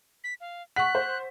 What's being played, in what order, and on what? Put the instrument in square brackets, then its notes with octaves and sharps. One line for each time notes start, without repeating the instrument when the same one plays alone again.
[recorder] B6
F5
[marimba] F#5 C#6 [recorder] F#6 [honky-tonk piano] B6
[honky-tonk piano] C5